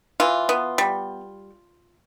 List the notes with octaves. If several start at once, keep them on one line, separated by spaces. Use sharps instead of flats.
E3 F4
B3
G3